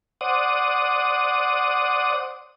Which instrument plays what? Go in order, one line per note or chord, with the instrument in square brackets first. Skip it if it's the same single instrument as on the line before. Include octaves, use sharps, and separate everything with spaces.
[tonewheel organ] C5 D5 F#5 D#6